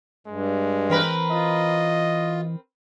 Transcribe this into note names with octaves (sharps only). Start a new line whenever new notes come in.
G2 G#3
E3 C4 A#4 B4
F4 D#5